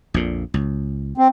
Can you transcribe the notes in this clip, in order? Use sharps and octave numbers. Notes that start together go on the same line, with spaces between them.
A#1 F2 A#2
C#2
C4